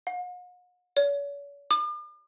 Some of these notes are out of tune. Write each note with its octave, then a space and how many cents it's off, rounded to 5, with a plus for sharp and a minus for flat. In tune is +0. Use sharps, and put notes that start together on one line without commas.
F#5 -45
C#5 +40
D6 +45